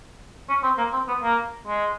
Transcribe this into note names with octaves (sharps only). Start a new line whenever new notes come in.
C#4
C4
A#3
C4
B3
A#3
G#3